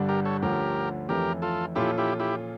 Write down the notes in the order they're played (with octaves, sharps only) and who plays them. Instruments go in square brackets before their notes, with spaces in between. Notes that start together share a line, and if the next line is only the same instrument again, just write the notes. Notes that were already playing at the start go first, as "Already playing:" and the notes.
Already playing: [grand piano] G1 G2 D3 G3 D4
[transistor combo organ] G4 A#4
A4 C#5
[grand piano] D2 D3 F3 A3 C#4 [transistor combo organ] G4 A#4
[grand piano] F2 E3 A3 C#4 [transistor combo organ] G4 A#4
[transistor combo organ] F4 A4
[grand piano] A#2 F3 C#4 F4 A4 [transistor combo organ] E4 G4
[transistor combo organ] E4 G4
E4 G4